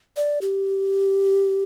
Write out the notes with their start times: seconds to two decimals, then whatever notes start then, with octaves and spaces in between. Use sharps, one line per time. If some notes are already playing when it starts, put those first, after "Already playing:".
0.17 D5
0.42 G4